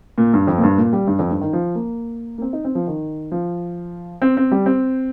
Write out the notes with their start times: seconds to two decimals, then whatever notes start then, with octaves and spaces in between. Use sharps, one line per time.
0.18 A#2
0.34 G2
0.47 F2
0.58 A#2
0.63 G2
0.78 A#2
0.93 G3
1.07 G2
1.19 F2
1.31 G2
1.41 D#3
1.53 F3
1.75 A#3
2.38 A#3
2.42 C4
2.53 D#4
2.65 C4
2.75 F3
2.87 D#3
3.32 F3
4.22 C4
4.37 C4
4.52 G3
4.66 C4